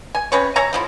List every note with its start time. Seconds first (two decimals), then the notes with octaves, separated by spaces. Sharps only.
0.15 G#5
0.32 C3 C#4 B4 C#5
0.56 C#5 E5 G#5 A#5
0.73 D3 F3 E4